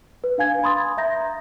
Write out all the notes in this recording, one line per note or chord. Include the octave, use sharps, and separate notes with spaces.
B4
D4 F5 G#5 G#6
B5 C6 D#6 A6
E5 A#5 G6 A#6